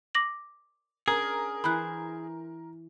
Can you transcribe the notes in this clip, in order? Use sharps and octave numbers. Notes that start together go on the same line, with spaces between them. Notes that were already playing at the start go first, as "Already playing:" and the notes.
D6 A#6 F#7
C#4 D4 G#4 A#4
E3 C5 B5 F#6